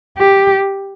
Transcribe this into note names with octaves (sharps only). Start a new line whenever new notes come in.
G4